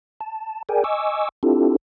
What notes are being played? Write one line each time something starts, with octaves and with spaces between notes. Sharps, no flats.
A5
G#4 A#4 D5 G5 G#5
D#5 G#5 C#6 D6 E6
C4 D4 E4 F4 G4 A4